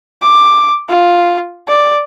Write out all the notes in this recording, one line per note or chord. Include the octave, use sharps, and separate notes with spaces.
D6
F4
D5